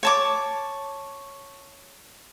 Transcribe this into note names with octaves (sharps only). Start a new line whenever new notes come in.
C#5 A5 D6